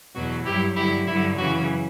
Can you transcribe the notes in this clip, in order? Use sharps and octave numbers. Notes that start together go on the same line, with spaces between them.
E2 B2 F#3 F#4
G2 F#3 E4 G4
G2 D3 F#3 E4 G4
G2 D3 F#3 E4
F#2 C#3 E3 F#4